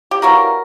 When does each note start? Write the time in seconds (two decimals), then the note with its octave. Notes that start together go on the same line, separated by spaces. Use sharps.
0.11 G4
0.22 E3 G3 A#3 C#4 F#4 A#4